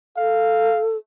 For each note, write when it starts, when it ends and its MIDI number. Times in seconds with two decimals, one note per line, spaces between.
0.17 0.97 69
0.17 0.82 77